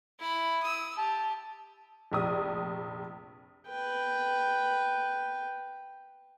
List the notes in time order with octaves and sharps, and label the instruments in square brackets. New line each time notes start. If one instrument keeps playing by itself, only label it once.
[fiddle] E4 B5
D#6 E6
[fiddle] G4 [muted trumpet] A5
[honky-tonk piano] F1 A#1 D#6
[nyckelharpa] B4 G5